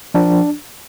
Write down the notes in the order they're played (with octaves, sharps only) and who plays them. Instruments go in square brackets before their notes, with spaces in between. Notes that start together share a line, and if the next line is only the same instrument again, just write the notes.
[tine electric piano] F3 D4